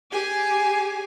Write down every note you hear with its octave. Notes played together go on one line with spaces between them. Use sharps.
G4 G#4 G#5